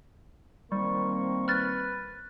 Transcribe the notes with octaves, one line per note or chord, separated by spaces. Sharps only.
D#3 G3 A#3 C4 C#6
B4 F6 A6